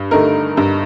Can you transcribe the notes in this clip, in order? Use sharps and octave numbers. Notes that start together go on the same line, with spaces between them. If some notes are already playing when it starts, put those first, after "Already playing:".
Already playing: G2
D3 A3 D#4 A#4
G2